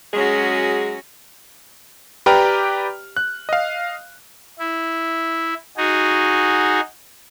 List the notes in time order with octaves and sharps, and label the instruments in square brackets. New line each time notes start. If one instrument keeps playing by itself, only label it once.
[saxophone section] F#3 G#3 G#4 [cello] C#4 F#4
[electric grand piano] G4 B4 D5 G5 A#5 F6
F#6
D#5 F5
[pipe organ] E4
D#4 F#4 G#4